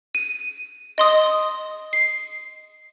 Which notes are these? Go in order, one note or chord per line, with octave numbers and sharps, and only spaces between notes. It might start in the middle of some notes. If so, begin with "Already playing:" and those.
D#7
D#5 C6 D#6
C7